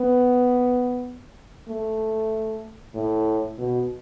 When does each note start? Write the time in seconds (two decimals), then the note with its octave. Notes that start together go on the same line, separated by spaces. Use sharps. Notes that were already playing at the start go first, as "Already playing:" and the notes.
Already playing: B3
1.69 A3
2.95 A2
3.58 B2